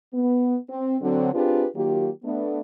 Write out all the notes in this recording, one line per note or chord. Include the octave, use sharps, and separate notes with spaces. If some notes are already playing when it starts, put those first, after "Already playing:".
B3
C4
D3 F#3 C4
C4 D4 F4 G4 G#4 B4
D#3 F#3 A#3 F4 G4
A3 B3 D4